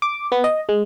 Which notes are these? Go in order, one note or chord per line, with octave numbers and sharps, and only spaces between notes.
D6
B3
D#5
G#3